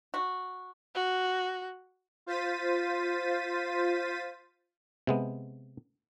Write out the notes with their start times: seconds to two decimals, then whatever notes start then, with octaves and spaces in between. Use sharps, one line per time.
0.14 F#4
0.95 F#4
2.26 F4 C5 A6 B6 D#7
5.07 C3 G#3 B3